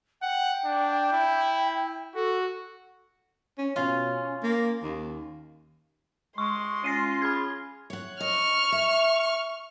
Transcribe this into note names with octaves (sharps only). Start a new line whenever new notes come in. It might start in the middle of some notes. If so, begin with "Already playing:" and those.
F#5 G5
D4
E4
F#4 A4
C#4
B2 C#4 F4
A#3
D#2
G#3 C6 C#6
C#4 F4 A#6 C7 D#7
G#4 B5 F6 G#6
C#5 F#5
D#5 C#6 F6
E5